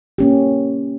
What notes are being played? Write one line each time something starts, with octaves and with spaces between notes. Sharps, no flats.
A#3 C#4 G4